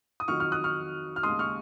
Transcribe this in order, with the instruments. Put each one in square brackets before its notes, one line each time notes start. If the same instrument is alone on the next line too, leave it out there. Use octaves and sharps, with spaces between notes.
[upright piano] D#6
F2 D#3 F#3 C#6 F6
C#6 F6
D#6 F#6
C#6 F6
F6
D#2 C#3 G#3 C6 D#6
C#6 F6